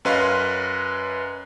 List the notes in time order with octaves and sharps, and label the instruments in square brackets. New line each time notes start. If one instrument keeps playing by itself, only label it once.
[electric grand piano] F#2 C#4 B4 D#5 F5 C6